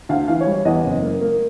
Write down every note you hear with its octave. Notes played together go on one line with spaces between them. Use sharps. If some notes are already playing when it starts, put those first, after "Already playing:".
D2 F5
E3 F5
C#5
G3
C#5
E2 D#5
F#1
A#3
A#3